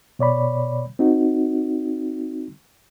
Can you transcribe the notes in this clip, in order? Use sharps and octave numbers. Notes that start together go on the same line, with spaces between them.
B2 C#5 D5 B5
C4 D#4 F#4